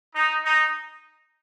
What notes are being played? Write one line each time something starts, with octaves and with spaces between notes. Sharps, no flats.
D#4
D#4